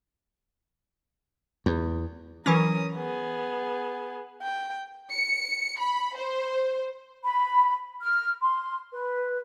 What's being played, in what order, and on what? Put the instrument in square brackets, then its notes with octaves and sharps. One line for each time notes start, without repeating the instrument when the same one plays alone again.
[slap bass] E2
[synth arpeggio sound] E3 F#3 C#4 [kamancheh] A#4 D#6
[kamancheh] B3 G#4
G5
[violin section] C#7
B5
C5
[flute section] B5
F6
C6
B4